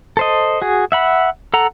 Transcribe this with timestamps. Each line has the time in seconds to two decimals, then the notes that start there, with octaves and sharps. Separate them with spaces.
0.17 A4 C5 D#5
0.62 F#4 G#4
0.92 E5 F#5 B5
1.54 A4 F#5 A#5